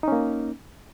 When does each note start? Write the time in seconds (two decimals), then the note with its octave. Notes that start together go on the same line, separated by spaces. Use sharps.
0.03 D#4
0.08 C#4
0.12 A#3